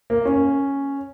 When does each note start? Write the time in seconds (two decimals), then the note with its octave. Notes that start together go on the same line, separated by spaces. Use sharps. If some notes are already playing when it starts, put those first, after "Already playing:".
0.10 A#3
0.25 C#4